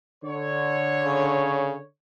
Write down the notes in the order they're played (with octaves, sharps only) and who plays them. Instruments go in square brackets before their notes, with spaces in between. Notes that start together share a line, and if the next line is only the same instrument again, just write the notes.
[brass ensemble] D3 C#5
[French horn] C#3